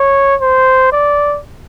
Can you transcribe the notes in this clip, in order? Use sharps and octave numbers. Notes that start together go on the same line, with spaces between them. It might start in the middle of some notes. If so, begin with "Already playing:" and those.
Already playing: C#5
C5
D5